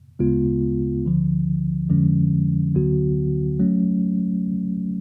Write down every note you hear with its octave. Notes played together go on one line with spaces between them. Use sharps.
D2 C#3 G#3 B3 F4
D2 D3 F3
F2 D3 F3 G#3 C#4
D2 D3 F#3 B3 F#4
F#3 A3 C#4